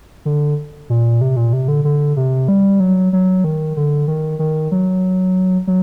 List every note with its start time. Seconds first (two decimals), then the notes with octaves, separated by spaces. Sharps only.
0.25 D3
0.90 A#2
1.21 C3
1.36 A#2
1.53 C3
1.68 D3
1.84 D3
2.17 C3
2.48 G3
2.80 F#3
3.13 F#3
3.44 D#3
3.77 D3
4.08 D#3
4.39 D#3
4.72 F#3
5.67 F#3